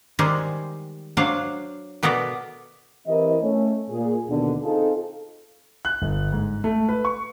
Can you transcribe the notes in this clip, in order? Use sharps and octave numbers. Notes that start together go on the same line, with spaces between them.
D#3 G3 G#3 C5
F#3 D4 C5 F5 F#5
B2 B3 A4 A#4 D5
E3 C4 E4 G4 A#4 D#5
A3 C#4
A#2 G#4
D#2 B2 D3
C4 D#4 F4 G#4 A4
F#6
G1
G#2
A3
B4
C#6